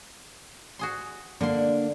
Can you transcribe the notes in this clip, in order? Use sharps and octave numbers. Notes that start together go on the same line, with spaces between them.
F#4 G#4 C6
D3 A#3 D4 C6